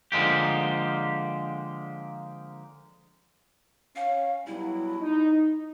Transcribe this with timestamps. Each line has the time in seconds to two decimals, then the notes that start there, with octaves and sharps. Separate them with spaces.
0.12 D3 F3 G#3 A#3 G4
3.96 C#4 F5
4.47 B2 F#3 G3 E4
5.01 D#4